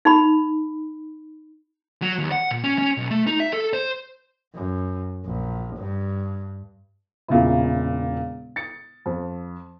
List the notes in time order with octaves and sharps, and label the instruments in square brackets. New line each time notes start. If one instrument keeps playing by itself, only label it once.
[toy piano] D#4 B5
[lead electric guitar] F#3
D#2
F#5
A#2
C#4
C#4
B1
A3
D#4
E5
A4
C5
[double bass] F#2
A#1
G2
[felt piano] E1 A#2 C#3 E4
A6 C#7
F2